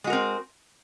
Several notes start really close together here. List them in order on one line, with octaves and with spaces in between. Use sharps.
G#3 F#4 A#4 C4